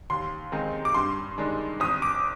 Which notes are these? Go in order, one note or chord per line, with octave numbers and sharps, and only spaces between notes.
D#2 C6
D#3 G#3 C4 D#4
D6
G2 C6
D#3 G#3 D4
G#1 D#6
D6